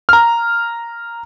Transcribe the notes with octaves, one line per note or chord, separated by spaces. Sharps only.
A#5 F6